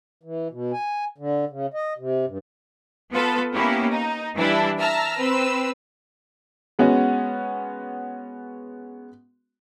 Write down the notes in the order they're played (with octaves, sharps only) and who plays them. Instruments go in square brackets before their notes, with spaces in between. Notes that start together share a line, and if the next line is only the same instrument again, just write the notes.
[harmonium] E3
B2
G#5
D3
C#3
D#5
C3
G2
[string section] B3 F4 A4 B4
A#3 B3 C#4 E4 G4
D#4
E3 G3 D4 E4
E5 A5 A#5 E6 F6
C4 B4 E6
[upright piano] G#3 B3 C#4 F#4